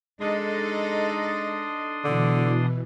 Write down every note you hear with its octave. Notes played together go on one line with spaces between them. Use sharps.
G#3 D4 D#4 A4 D#5 C6 D#6
B2 D3 E3